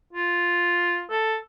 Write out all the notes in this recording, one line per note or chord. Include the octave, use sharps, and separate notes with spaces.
F4
A4